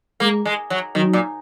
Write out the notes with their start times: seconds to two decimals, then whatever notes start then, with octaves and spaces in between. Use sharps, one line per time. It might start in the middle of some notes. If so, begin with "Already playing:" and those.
0.20 G#3 A#3
0.45 G#3
0.70 F#3
0.95 D#3 F#3
1.13 A#2